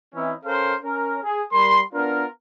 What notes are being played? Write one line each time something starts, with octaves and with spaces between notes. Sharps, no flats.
E3 C4 C#4 D#4 E4
C#4 A4 A#4 C5 F5
C#4 A#4
G#4
G3 A#4 B5 C6
B3 D4 F4 A#4